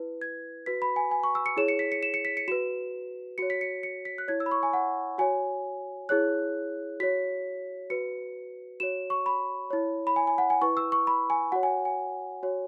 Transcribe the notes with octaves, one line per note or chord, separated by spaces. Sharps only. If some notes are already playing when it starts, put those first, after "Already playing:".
Already playing: E4 B4
G#6
F#4 B4 B6
B5
G#5
G#5
C#6
E6
C#7
E4 G#4 C#5 E7
C#7
B6
C#7
E7
C#7
B6
C#7
F#4 B4 E7
F#4 C#5 C#7
B6
C#7
C#7
B6
F#6
E4 C#5 G#6
E6
B5
C#6
G#5
F#5
F#4 C#5 G#5
E4 G#4 C#5 F#6
F#4 C#5 B6
F#4 B4 C#7
F#4 C#5 E7
C#6
B5
E4 C#5
B5
G#5
G#5
F#5
G#5
E4 B4 C#6
E6
C#6
B5
G#5
F#4 C#5 F#5
G#5
G#5
F#4 C#5